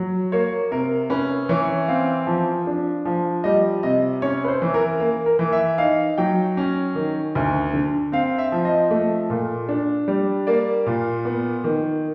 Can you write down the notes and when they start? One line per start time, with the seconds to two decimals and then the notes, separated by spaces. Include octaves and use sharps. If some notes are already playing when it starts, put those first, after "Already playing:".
Already playing: F#3
0.32 A#3 C#5
0.71 C3 A#4
1.10 C#4 B4
1.49 E3 C#5
1.88 C4 F5
2.27 F3
2.67 D4
3.05 F3
3.44 G3 D#5
3.83 C3 D#5
4.22 C#4 C#5
4.44 B4
4.48 C5
4.62 E3
4.74 A#4
5.00 A#3
5.26 A#4
5.39 E3
5.53 E5
5.78 D#4 F5
6.18 F#3 G5
6.57 C#4
6.95 D#3
7.35 D2
7.73 D3
8.12 C4 F5
8.38 E5
8.52 F3
8.65 D#5
8.91 A3
9.30 A#2
9.69 D4
10.08 G3
10.47 A#3 D5
10.86 A#2
11.25 B3
11.64 D#3